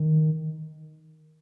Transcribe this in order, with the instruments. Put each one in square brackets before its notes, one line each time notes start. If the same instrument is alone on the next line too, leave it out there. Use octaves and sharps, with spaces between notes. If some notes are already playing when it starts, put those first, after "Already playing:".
Already playing: [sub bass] D#3